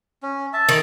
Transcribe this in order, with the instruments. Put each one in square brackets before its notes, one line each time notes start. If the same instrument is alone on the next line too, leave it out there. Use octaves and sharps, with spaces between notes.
[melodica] C#4
E5 A5
[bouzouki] D#3